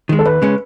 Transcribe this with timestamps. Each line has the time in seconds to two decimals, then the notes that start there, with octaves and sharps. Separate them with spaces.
0.09 D#3 G#3
0.19 A4
0.25 D#2 B4
0.42 C#3 G#3 C#4